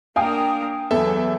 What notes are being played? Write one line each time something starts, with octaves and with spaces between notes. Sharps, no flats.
A#3 D4 A#4 F5 G5 G#5 D#6
E2 F#3 A4 E5